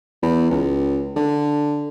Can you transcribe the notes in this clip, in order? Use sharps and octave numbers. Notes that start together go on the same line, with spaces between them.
E2
C#2
D3